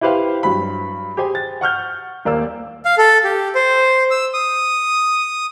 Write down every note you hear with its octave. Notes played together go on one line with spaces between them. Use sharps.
E4 G4 B4 C5 F5 G5
G2 F#3 B5
G4 G#4 C5 G5 G#5
A6
F#5 C#6 F6 G6
D#1 A#3 D5 E6
F5
A4
G4
C5
E6
D#6